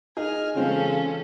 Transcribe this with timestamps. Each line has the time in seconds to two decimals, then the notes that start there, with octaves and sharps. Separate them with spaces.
0.17 D#4 G#4 G#5 F6
0.55 C#3 E3 G#3 C4 C#4 F4 A4